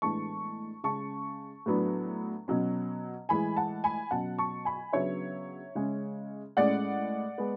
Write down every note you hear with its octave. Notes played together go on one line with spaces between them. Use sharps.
A2 E3 G#3 B3 D4 A5 C#6
C#3 G#3 C#4 A5 C#6
A2 F#3 B3 D4
B2 F#3 C#4
A2 E3 G#3 G#5 B5
F#5 A5
G#5 B5
B2 F#3 C#4 F#5 A5
A5 C#6
G#5 B5
C#3 F#3 B3 D4 C#5 E5
C#3 G#3 C#4
A2 G#3 C#4 D5 F#5
G#3 B3